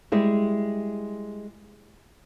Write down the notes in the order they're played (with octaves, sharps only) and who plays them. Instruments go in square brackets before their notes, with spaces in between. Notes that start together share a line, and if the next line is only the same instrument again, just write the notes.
[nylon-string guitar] G3 G#3 E4